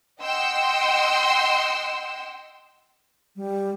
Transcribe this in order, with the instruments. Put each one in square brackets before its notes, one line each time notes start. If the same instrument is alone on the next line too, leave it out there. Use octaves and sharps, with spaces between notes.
[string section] D#5 F#5 G5 C6 E6
[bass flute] G3